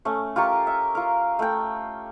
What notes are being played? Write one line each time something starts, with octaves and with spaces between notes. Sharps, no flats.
A3 C#4
F4 G4 A#4 C#6
E5
F4 A#4
A3 G5